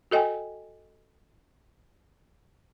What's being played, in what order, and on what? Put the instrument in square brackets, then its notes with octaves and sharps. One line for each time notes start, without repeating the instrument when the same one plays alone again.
[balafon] F#4 A4 D#5 G5 G#5